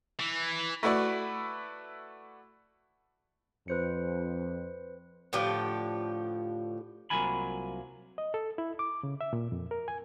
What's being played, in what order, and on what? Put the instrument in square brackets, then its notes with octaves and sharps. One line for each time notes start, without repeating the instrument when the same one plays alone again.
[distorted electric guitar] E3
[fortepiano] A3 E4 F#4 B4 D5
[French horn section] F2 [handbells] B4 C5 C#7
[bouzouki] A2 D3 F3 G4
[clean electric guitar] C2 F#3 A#3 F4 G#5 B5
[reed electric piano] D#5
A4
E4
D6
C#3
E5
A#2
F2
A#4
G#5